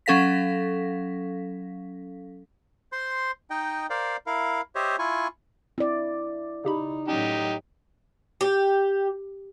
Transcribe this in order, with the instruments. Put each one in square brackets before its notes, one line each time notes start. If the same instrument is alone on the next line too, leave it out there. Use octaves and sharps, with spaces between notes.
[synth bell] F#3 C#4 A4 F5 A#6 B6
[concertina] C5 C6
D#4 D#5 G5
A#4 C5 D5 F5
E4 A#4 F5
G4 C5 C#5 D#5 E5
E4 F4 G#5 C#6
[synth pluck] C4 [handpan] E4 D5
[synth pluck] C#3 G4 B5 [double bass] D#4
[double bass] A2 F#3 [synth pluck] C#4 [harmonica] D#4 G4
[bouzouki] G4